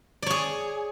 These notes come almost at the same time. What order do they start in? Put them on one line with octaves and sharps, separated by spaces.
D5 C#5 G#4